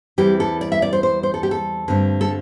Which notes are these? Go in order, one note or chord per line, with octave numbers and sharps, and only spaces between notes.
E2 E3 G3 C4 G4
A4
D5
E5
D5
C5
C5
C5
A4
G4
A4
G2 D3 A3 C4
A4